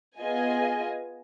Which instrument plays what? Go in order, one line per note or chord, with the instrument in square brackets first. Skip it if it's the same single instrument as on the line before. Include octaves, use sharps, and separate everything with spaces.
[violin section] B3 F4 G#4 D#5 G#5